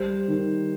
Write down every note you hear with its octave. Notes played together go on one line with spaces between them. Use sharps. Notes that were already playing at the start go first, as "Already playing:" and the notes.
Already playing: G3 C5
D#3